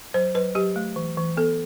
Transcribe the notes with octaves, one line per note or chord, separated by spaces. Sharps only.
F#3 C5
F#3 B4
F#3 G4
A3
E3
E3
B3 A4